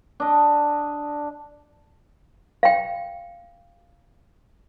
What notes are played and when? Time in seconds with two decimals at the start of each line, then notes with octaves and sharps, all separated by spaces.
0.20 D4 D#5
2.63 F5 G5